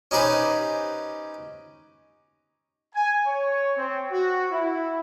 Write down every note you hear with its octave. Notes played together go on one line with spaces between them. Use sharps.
C#4 D#4 G4 B4 C5 G#5
G#5
C#5
C4
F#4
E4